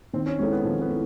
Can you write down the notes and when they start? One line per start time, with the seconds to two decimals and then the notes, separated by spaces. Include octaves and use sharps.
0.13 D#3 C4
0.26 C#4
0.39 G#3 C4 C#4 E4 A4
0.52 B3
0.64 D#3 F3
0.81 B3
0.90 E4 A4